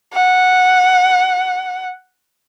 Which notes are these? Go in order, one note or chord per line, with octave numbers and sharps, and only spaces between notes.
F#5